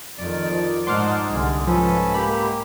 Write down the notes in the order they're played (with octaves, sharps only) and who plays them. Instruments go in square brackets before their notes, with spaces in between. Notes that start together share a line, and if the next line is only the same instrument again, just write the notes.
[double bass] F2 D#3 [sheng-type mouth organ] D5
[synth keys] F3
[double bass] G#2 D#4 [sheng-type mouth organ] C5 F#5 A5 [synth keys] C6 D6 F6
[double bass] C2 D3 [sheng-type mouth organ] G#4
[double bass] G#2 [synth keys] F3 [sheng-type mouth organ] C#4 A4 B4
[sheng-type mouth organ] A#3 G4 [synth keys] B5